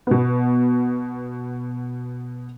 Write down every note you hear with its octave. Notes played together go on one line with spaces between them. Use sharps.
B2 B3